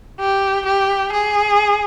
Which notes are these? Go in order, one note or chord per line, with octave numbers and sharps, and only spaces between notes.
G4
G4
G#4